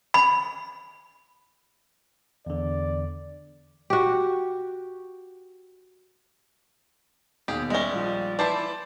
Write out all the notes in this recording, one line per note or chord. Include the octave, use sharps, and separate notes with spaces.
B5
E2 D3 D5
F#4 G4
D#2 B2 G4 G#4
G3 G#3 C#4 E5 A#6 G7
A#1 F3
E3 E4 D5 A5 C6 G6 C7